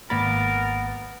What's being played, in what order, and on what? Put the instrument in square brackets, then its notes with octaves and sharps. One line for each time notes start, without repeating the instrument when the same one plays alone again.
[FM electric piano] G#1 A6 [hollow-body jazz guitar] A#3 B5 [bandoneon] B3 [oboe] A#4